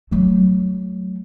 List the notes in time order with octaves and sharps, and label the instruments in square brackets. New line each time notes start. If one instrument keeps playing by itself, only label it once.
[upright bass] F#3 A3